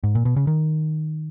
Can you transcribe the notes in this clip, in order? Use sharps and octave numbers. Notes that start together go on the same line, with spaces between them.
G#2
A#2
B2
C#3
D#3